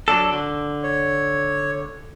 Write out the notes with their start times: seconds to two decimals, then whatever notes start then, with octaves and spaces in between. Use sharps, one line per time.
0.08 F#3 D4 A4
0.33 D3
0.83 C#5